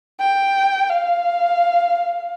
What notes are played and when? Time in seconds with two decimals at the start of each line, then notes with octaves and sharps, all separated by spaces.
0.19 G5
0.89 F5